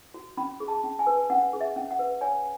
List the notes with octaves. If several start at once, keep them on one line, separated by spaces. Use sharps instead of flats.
F#4
C#4 B5
G#4
A5
C#4
G#5
B4
C#4 F#5
G#4
E5
C#4
F#5
B4
C#5 G#5